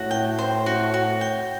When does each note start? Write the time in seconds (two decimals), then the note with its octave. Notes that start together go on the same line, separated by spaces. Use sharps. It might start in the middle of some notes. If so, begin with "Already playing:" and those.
Already playing: A2 F#4
0.11 G5
0.39 C5
0.66 F#4
0.94 F#4
1.21 G5